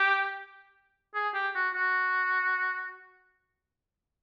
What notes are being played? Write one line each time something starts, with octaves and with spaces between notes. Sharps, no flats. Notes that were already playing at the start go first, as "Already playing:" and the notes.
Already playing: G4
G#4
G4
F#4
F#4